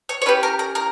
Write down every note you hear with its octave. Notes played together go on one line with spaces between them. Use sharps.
C#5
C#5
C#4 G4 B4
A#4
A#4
A#4